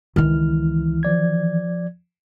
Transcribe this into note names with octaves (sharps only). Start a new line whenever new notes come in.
C#2 D#3 E3 E4 F6
F3 D5 G#6